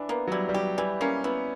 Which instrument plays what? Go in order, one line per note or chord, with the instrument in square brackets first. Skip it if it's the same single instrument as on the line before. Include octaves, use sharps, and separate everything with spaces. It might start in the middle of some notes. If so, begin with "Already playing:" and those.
Already playing: [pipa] E3 [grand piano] D4
[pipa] A#3 [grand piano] B3
[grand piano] F#3
[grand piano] G3 [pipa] E4
[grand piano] G3
[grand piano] F#3 [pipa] G4
[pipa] E3 [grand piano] G3
[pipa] A#3 [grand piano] C#4
[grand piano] B3 [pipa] E4